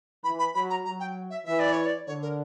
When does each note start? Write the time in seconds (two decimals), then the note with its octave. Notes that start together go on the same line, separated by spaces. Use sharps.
0.24 E3 B5
0.39 B5
0.55 F#3 B5
0.70 A#5
0.85 F#3 A#5
1.00 G5
1.30 E5
1.45 E3 E5
1.60 D5
1.73 C#5
1.86 D5
2.07 D3 C#5
2.22 A#4